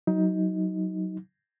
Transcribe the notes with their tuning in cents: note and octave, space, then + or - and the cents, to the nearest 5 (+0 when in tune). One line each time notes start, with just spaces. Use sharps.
F#3 +10 D#4 +20